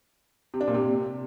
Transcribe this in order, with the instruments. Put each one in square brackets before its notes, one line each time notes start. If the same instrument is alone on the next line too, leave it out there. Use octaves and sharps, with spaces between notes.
[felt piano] C3
D4
A#2
C3